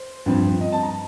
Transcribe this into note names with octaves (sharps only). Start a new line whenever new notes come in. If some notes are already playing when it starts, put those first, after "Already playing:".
Already playing: C5
G2 F3 C4
D#5
A5
A#5